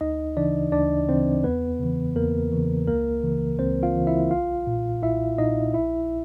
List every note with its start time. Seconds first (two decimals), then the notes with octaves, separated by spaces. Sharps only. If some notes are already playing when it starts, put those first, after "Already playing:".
0.01 D2 D#4 D#5
0.37 C#3 E3 D4 D5
0.72 D2 D4 D5
1.08 C#3 E3 C4 C5
1.44 E2 B3 B4
1.80 C#3 E3
2.16 E2 A#3 A#4
2.52 C#3 E3
2.87 C#2 A#3 A#4
3.24 C#3 E3
3.59 C#2 C4 C5
3.83 F4 F5
3.95 C#3 E3
4.07 E4 E5
4.31 B1 F4 F5
4.67 A#2
5.03 B1 E4 E5
5.38 A#2 D#4 D#5
5.74 A#1 E4 E5